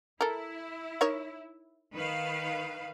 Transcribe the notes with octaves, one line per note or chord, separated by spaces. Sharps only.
E4 A4 A#4
D#4 A#4 C#5
D#3 B4 F5